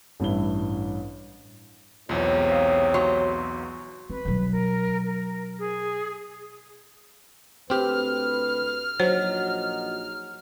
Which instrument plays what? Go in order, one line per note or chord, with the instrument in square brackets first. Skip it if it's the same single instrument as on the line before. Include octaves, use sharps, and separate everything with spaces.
[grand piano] A1 G2 E4 G7
[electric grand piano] B1 E2 [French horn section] G#2 C3 C#5 [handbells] F4
[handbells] F5 D#6
[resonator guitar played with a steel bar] F#3 [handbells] C6
[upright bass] C4 [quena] B4
[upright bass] B2 F#3
[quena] A#4
A#4
G#4
[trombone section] D2 B4 [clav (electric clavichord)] C4 G4 [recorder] F6
[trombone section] A#1 D#4 F#4 [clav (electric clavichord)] F#3 [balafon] C5